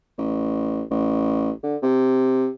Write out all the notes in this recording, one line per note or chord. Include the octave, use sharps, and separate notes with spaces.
A1
A1
D3
C3